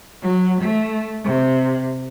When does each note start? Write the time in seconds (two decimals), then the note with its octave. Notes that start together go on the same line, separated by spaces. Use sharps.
0.22 F#3
0.61 A3
1.24 C3